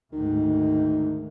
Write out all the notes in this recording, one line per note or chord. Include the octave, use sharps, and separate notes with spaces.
D2 G#2 D#3